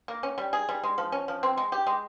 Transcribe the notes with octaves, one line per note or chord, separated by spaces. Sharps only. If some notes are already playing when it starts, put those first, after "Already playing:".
A#3
C#4
G3
G#4
G3
G#3
F3
C#4
F3
C4
G#3
G4
G#3